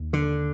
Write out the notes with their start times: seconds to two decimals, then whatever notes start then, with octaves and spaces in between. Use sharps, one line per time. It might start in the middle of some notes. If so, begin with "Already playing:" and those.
Already playing: D#2
0.13 D3